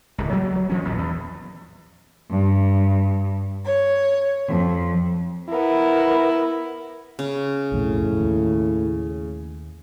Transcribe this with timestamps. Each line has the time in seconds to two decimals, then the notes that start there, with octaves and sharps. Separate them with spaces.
0.18 D1 C#2
0.33 F#3 G#3 A#3
0.56 F#3
0.70 E3 F3 C#4
0.85 A#1 D#2 A2
0.98 E2
2.30 G2
3.66 C#5
4.47 F2
5.49 B3 E4 A#4
7.19 C#3
7.72 B1 F2 A2
8.20 D#2